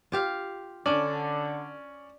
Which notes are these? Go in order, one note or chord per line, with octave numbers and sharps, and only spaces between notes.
F4 G4 F5
D3 C#4 D4 D5